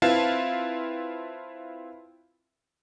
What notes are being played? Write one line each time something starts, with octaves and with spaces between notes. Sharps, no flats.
C4 E4 F4 B4 F5 A5